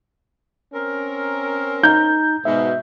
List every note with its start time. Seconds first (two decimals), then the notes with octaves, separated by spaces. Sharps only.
0.74 C4 C#4 A#4
1.83 D#4 A#5 G6
2.45 G#2 B2 E5